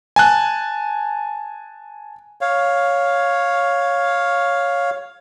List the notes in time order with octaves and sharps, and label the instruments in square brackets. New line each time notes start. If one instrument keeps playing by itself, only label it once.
[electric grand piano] G#5 A5 F#6
[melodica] C#5 F5